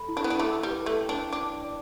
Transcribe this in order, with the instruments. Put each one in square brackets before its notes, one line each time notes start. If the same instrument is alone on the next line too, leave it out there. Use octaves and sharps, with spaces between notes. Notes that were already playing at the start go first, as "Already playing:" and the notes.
Already playing: [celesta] A4 B5
E4
[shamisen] D4
B3
D4
[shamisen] A3 [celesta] D6
[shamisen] G3
[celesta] B4
[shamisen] A3
[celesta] G5
[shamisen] D4
[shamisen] D4 [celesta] D6
[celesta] D5